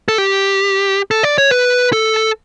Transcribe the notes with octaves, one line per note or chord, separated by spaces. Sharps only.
A4
G4
A4
D5
C#5
B4
A4